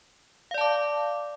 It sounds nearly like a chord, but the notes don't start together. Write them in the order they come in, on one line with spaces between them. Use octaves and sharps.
F5 D5 A5 D6